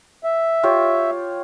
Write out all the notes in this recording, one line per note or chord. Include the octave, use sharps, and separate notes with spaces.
E5
F4 G4 C#5